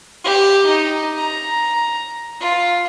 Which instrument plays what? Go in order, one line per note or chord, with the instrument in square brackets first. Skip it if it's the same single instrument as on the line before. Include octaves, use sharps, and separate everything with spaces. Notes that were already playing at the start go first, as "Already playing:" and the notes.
[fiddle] G4
D#4
A#5
F4